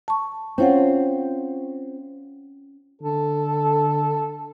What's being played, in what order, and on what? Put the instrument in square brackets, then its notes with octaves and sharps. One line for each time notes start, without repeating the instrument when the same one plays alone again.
[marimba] A5 C#6
[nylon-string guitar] C4 F4 [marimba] C#4 C#5 F#5
[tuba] D3 [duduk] A4